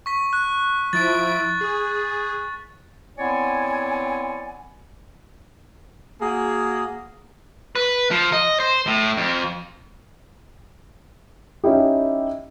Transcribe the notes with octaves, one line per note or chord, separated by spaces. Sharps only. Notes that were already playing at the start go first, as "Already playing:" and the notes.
C#6 B6
F#6
F3 E4 A6 D7
G#4
B3 C4 E4 C#5 D5 G#5
A#3 F#4 G#4
B4
F3
D#5
C5
A2
F2
C#4 D#4 E4 G4